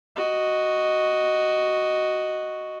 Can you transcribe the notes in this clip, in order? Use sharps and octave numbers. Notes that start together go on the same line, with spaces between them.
F#4 D#5